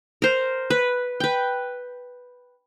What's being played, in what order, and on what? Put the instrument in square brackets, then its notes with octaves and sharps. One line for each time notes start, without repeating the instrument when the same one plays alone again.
[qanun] A#4 C5
B4
B4 G5